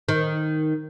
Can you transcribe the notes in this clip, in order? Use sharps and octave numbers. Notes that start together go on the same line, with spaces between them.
D#3